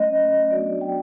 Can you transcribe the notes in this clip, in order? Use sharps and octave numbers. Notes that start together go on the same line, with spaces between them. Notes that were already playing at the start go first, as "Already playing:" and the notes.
Already playing: F#3 A3 C#4 D#5
F#3 B3 D4 F#4 D5
G5